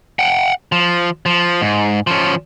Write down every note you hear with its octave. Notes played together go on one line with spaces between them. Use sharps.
F#5 G5
F3
F3
G#2
F3 C#4